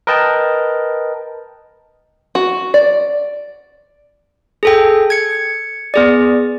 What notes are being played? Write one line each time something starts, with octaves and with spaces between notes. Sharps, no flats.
A#4 B4 D#5 G5 A5
F#4
D5
G#4 A4 G5
G#6 C#7
B3 G#4 D5